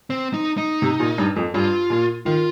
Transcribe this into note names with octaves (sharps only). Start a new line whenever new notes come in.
C4
D#4
D#4
C3
A#2
G2
F2
G2 F4
A#2
D#3 F4